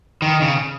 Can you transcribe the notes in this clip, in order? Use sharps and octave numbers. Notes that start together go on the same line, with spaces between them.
D#3
C#3